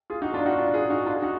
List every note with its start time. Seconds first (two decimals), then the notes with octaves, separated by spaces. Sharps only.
0.10 F4 G#4
0.22 D#4 F#4
0.34 D4 F4
0.46 D#4 F#4
0.58 D4 F4
0.74 F4 G#4
0.90 D#4 F#4
1.06 D4 F4
1.15 G#4
1.22 D#4 F#4